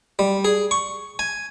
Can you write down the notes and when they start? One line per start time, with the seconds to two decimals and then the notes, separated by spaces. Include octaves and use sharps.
0.19 G3
0.45 G#4
0.71 C#6
1.19 G#5